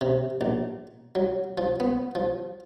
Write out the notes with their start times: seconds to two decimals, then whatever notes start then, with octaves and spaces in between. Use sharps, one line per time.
0.01 C3
0.41 A#1
1.15 F#3
1.58 F3
1.80 B3
2.15 F3